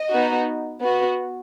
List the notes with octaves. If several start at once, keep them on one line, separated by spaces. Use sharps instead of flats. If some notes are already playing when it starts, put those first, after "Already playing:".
Already playing: D#5
B3 D#4 F#4
B3 F#4